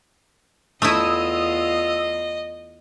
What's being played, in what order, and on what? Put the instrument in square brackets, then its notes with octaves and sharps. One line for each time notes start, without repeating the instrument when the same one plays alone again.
[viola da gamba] E2 F4 [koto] A3 E4 [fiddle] D#5 [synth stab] D#6 E6